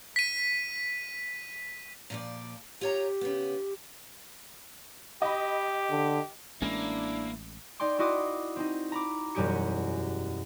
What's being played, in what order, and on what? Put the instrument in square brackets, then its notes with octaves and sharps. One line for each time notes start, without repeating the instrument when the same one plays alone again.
[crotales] B6 D#7
[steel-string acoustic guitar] A#2 F3 D5
[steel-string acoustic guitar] F4 C#5 A#5 [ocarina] G4
[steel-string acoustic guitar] C#3 B3
[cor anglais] G4 [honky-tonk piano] D#5 B5
[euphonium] D3
[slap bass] A1 G#3 C#4 [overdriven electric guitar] A#3 [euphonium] D4 [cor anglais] E4
[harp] D#4 D5 G5 C6 D6
E4 F#4 D#5 C6 D6 D#6
C4 D#4
A#5 B5 D6
E1 F#2 G3 G4 G#4 C#7